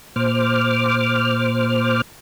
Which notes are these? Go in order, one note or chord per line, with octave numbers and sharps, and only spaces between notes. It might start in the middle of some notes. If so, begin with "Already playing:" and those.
A#2 C5 D6 F6